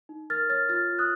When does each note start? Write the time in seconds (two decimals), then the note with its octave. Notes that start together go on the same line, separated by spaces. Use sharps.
0.09 D#4
0.30 A#4 F6 A6
0.49 C#5 F6 A6
0.69 F4 F6 A6
0.89 F4
0.99 D#6 F#6